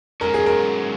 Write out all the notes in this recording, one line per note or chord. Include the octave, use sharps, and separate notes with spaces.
G#2 F#3 C#4 A#4
G#4
A#4